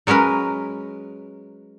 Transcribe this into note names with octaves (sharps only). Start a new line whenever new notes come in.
F#3 G#3 C#4 A#4 B4